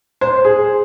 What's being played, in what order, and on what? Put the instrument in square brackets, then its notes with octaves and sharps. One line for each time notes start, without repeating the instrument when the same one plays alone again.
[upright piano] C5
G#4